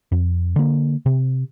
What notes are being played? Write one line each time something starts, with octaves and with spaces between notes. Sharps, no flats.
F2
D3 A#3
C3